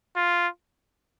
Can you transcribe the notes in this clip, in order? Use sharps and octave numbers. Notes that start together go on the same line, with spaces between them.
F4